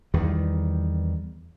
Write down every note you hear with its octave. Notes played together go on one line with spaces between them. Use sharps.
E2 D#3 G3